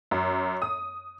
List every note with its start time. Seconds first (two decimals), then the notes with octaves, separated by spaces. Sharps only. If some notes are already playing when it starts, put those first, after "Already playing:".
0.11 F#2
0.62 D#6